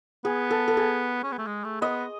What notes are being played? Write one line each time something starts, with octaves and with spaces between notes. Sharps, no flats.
B3 G#4
A4
A4
G#4
C#4
B3
A3
G#3
A3
B3 D#5